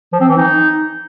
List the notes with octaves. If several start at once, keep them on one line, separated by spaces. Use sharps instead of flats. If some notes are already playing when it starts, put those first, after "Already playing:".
F3
C4
E3
D#4